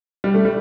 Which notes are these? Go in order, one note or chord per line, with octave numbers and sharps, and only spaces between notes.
G3
A3
G3